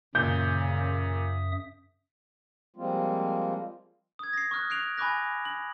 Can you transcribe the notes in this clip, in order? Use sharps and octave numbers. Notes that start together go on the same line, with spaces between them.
F#2 A#2 C#3 E5 D#6 G6
F3 G3 G#3 A#3 C4 F4
D#6 G#6
A#6 C7
C#6 D#6 F6 F#6
F#6 C7 D7 F7
G#5 B5 C#6 D6 F#6 A#6
F#7